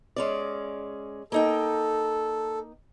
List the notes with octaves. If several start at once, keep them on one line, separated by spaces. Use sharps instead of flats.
G#3 C#4 D5
A#3 D#4 A4 G5